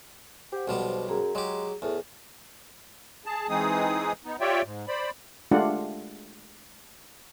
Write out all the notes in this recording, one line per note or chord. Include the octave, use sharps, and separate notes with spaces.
G4 C5 F#5
B1 B2 F3 G3
F#2 G#4 A#5
F#3 G#3 G4
E2 A2
G#4 A5
E3 G#3 C4 D#4 G#4 D#6
B3 D#4
F4 G4 C#5 D5 E5 G5
G#2
C5 D5 B5
G#3 A3 D4 F4 G4 F#5